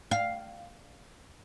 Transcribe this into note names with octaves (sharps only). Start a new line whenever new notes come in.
F5